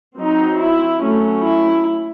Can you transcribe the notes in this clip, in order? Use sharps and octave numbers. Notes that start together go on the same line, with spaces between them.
F#3 C4 D#4
E4
F#3 A3 C#4
E4